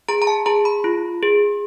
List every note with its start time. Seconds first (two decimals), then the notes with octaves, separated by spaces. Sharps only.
0.09 G#4 A#5
0.22 A#5
0.27 A5
0.46 G#4 A#5
0.65 B5
0.84 F4
1.23 G#4